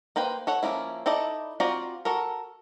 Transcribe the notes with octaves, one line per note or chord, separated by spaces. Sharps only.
A#3 B4 C5 G5
A4 C#5 F#5
F3 A#3 C#4 E4
D#4 E4 A4 D5 D#5
C4 F4 F#4 D5 A#5
F#4 A4 A#4